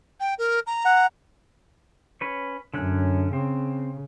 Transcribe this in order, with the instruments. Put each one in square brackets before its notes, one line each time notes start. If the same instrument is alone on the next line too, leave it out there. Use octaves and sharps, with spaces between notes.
[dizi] G5
A#4
A#5
[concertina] F#5
[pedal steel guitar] C#4 B4 C#5
[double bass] F#2 [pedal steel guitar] D3 C#4 F#6
[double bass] C#3 [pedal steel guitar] C4